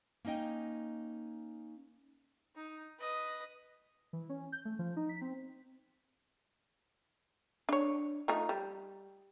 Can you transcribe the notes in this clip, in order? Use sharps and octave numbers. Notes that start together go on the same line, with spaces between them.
A#3 C#4 D#4 D#5 G5
D#4
B4 D#5
E3
C#4
G6
A3
F3
D#4
B6
C4
D4 C#5
F3 A3 D#4
G3